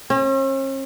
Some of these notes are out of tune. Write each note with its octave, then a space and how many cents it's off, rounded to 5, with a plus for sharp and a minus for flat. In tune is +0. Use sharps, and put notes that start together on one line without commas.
C#4 -45